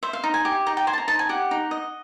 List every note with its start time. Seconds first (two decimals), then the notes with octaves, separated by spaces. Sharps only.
0.03 C5 E5
0.13 F5
0.24 D#4
0.34 G#5
0.45 G4 G#5
0.67 D#4 G5
0.77 G5
0.87 C5 G#5
0.93 A5
0.98 A#5
1.08 D#4 A5
1.19 G#5
1.29 G4 F#5
1.51 D#4
1.71 D#5